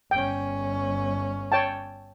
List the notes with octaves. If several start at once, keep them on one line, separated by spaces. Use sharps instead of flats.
G1 C#4 G5
C#5 G5 A5